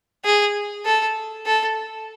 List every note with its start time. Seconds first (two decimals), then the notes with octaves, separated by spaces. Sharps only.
0.25 G#4
0.86 A4
1.46 A4